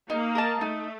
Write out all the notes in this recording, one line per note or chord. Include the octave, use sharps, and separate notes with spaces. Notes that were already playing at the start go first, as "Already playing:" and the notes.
A#3 D#4
A#4 D#5 A5
A3 D#4